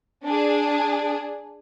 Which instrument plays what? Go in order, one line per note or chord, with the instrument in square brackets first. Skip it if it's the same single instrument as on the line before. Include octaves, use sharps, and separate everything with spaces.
[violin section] D4 G#4